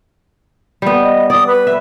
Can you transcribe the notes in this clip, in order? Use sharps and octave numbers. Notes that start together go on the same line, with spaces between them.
G3 B3
D#5
D5 D#6
B4
E5